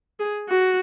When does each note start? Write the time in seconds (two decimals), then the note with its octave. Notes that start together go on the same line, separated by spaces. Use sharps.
0.20 G#4
0.50 F#4